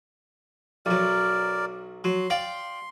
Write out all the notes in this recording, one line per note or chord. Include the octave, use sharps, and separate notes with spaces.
B1 F#3 A#4 D5
F#3 C6
D5 F5 G5